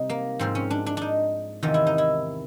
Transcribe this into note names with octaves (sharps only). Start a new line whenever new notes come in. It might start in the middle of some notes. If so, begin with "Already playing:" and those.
Already playing: C3 G3 D#4
A#3
G#2 F3 C4
C#4
D4
D4
D4 D#4
E2 C3 D#3 F4
E4
D#4
E4